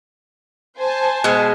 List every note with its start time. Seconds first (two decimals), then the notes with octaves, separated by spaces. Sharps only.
0.78 C5 G#5 A5
1.24 B2 G#3